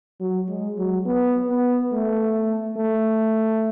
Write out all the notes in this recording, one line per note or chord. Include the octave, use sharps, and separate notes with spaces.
F#3
G#3
F#3
B3
B3
A3
A3